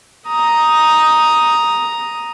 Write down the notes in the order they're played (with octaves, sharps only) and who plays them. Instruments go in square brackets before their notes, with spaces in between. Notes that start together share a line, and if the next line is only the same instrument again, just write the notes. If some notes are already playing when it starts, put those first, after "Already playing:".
[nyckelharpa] A#5 D#6